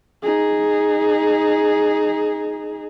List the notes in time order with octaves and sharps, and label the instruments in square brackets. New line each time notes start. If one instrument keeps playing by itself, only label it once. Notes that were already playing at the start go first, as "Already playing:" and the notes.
[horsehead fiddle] D#4 G#4